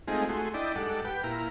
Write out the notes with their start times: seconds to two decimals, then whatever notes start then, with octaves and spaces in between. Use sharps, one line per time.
0.07 G#3 A3 C4 D#4 F4 G#4
0.29 A3 F#4 G#4 C6
0.54 D4 E4 D5 D#5 G5
0.76 G#2 G3 A4 F#5 D6
1.04 G4 B4 F#5 G5
1.23 A#2 E4 A#5 F6